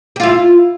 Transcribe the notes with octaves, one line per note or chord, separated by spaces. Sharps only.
E4 F4 G4